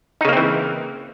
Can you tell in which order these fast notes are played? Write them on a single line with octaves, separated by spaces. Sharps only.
D#4 C#3 A#3 C4 E3